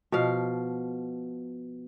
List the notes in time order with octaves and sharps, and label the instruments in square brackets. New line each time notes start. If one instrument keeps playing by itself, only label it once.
[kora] B2 F3 F5